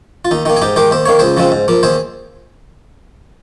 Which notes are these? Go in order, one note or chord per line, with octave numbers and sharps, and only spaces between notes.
F4
D#2 D#4
D#3 A#3 D#4
G#4
G#2 D#4 G4
D#3 G#3 G4 A#4
D#2 C5
D#3 A#3 C#5
C#2 G#4 C5
C#3 F3 G#3 C4
G#2
F3 A#3
D#2 G#4 C5